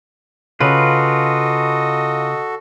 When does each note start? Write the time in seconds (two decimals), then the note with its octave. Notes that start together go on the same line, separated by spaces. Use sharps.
0.60 C#3 F4 F#4 A4 B4 D#5